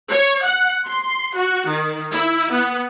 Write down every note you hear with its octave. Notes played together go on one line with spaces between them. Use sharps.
C#5
F#5
C6
F#4
D#3
E4
B3